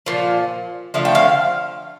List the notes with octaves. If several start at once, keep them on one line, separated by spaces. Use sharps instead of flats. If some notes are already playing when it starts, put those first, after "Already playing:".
A#2 F3
D3 F3 A3 F5
G5
F5